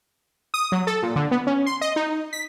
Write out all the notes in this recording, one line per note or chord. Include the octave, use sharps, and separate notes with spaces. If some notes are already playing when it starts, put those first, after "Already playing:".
D#6
F#3
A4
A#2
D3
B3
C#4
C6
D#5
D#4
B6